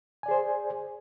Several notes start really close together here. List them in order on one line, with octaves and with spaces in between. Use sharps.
G#5 D5 G#4 C5